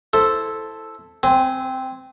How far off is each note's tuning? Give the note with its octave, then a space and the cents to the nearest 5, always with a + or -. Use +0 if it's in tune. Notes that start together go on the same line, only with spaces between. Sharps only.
E4 +0 A4 +0 C5 +0
C4 +0 C5 -40 G#5 +0